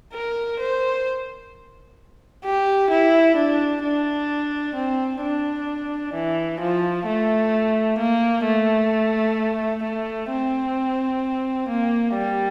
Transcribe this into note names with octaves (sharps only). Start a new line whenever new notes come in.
A#4
C5
G4
E4
D4
D4
C4
D4
E3
F3
A3
A#3
A3
A3
C4
A#3
G3